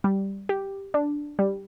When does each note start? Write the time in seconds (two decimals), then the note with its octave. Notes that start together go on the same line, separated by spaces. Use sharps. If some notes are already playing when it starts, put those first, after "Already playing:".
0.04 G3
0.49 G4
0.94 D4
1.39 G3